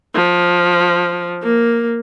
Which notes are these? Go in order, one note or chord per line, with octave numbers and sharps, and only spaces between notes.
F3
A#3